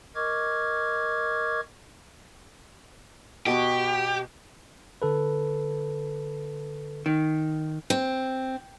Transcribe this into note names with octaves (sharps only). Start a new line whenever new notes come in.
A#4 D#5 C#6 D6 F6 G#6
B2 G4 B4 C#6
D3 A4 B4
D#3
C4